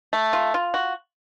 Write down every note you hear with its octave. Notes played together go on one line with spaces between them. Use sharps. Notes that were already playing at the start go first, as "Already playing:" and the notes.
A3
F4
F4
F#4